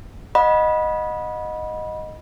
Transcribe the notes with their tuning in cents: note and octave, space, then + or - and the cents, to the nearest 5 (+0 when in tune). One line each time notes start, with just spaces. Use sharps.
D#5 +0 F#5 -30 B5 -20